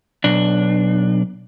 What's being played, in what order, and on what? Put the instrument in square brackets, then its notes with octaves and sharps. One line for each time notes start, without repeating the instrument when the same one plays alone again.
[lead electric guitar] B1 D4